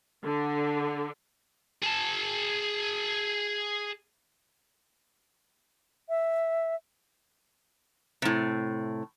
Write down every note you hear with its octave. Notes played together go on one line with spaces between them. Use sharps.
D3
G#4 A5
E5
A2 C3